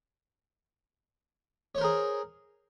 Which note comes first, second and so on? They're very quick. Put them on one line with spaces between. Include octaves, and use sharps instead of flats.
C#5 C5 A#4 G#4